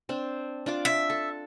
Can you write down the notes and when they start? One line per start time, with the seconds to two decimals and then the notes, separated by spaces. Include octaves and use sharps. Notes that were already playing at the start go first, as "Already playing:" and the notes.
0.09 C4 D4
0.66 D4 F4 D6
0.85 E5
1.10 A4